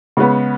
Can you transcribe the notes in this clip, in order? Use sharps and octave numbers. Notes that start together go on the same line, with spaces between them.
C#3 G#3 B3